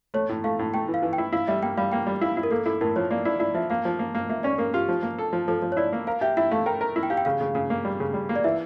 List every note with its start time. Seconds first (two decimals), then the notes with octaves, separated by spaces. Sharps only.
0.14 A3 C#5
0.29 A2
0.44 A3 F5
0.59 A2
0.74 A3 G5
0.88 E3
0.94 F5
1.02 E3
1.13 G5
1.18 E4
1.32 E4 F5
1.47 G3 E5
1.62 A#3 G5
1.77 G3 F5
1.92 A#3 G5
2.07 G3
2.21 E4 F5
2.37 E4
2.43 A#4
2.51 A#3 A4
2.66 E4 A4
2.81 A2 A#4
2.96 F3 C#5
3.11 A#3 D5
3.25 E4 D5
3.40 E4 D5
3.54 F3 E5
3.70 A#3 F5
3.85 F3
3.99 A#3
4.15 A#3
4.29 A#3 E5
4.43 C#4 D5
4.58 A#3 A#4
4.74 F4 G4
4.89 F3
5.03 A#3
5.19 A4
5.33 F3
5.48 F3 A4
5.62 F3
5.72 C#5
5.77 E4 D5
5.93 A#3
6.07 A#4 F5
6.21 G4 E5
6.37 E4 E5
6.52 A3 F5
6.66 A#4 G5
6.81 A#4
6.96 E4
7.03 G5
7.10 G4 F5
7.17 G5
7.25 C#3 F5
7.41 C#3
7.55 C#3
7.70 A#3
7.85 G3
8.00 C#3
8.14 G3
8.29 A#3
8.36 D5
8.44 E3 E5